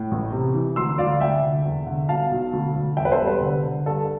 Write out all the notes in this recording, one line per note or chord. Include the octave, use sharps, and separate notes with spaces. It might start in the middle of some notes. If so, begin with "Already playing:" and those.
Already playing: A2
A1
C3
E3
D2 C6 E6
D2 D5 F5
D2 E5 G5
D3
E2
D3
B2 F5 A5
B1
D2
D2
E1 E5 G5
B4
A4 C5
G3
B4
D3
D3
G2 A4